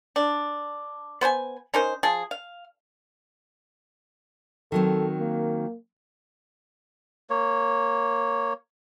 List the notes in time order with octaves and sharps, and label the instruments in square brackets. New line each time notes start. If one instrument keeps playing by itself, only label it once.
[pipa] D4
B3 C5 C#5 G#5
C#4 D#4 A#4 C5
F3 G#4
F5
[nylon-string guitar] D#3 F#3 C4 [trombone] A4
[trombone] A#3
[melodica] A#3 C#5